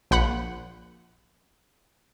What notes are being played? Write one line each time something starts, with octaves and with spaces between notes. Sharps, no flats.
A#1 F#5 B5 F#6